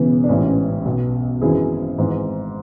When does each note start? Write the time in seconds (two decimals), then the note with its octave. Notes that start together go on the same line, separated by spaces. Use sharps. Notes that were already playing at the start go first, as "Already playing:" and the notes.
Already playing: E1 E2 C#3 E3
0.24 D4
0.29 A1 G#2 E3 C#4 E4
0.85 B1 B2
1.42 G#1 F#2 E3 E4 G#4
1.98 G#1 G#2 E3